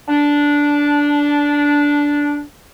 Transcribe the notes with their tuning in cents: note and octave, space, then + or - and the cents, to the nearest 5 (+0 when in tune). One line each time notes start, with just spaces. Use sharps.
D4 -10